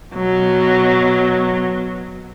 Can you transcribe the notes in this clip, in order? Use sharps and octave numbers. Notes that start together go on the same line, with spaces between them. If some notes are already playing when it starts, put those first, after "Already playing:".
B2 F#3